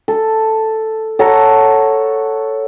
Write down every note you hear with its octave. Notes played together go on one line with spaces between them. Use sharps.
A4
A4 C#5 F#5 A#5